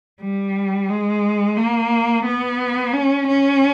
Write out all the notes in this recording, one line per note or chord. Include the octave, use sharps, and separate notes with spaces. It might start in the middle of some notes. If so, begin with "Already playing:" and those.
G3
G#3
A#3
B3
C#4
C#4